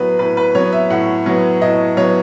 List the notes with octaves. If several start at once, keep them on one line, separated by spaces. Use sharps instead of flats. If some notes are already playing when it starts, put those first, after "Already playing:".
Already playing: A2 F#3 B3 B4
A2 B4
B4
F#3 B3 C#5
E5
A2 F#5
F#3 B3
A2 D#5
F#3 B3 C#5